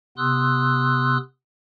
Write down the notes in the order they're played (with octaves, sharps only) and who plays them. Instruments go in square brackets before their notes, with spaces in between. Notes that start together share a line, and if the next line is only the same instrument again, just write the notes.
[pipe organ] C3 B3 C6 D#6 E6 F#6